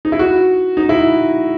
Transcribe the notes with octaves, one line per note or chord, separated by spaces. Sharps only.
D#4
E4
F#4
D#4
E4